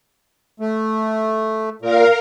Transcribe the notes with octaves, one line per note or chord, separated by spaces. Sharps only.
A3
A#2 A#4 F5